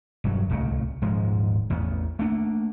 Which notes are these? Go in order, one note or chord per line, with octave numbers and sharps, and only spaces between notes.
E1 G2 F#3
D1 C2 A#2 A3
D#1 G#2 F3 G#3
A1 E2 B3
A3 A#3 D4